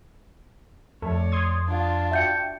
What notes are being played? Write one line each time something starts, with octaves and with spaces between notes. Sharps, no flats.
F2 A3 C#5 D5
C6 D#6 G#6
D4 F4
F#4 E5 G5 G6 C#7